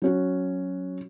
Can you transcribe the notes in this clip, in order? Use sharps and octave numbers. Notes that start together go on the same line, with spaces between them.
F#3 C#4 F#4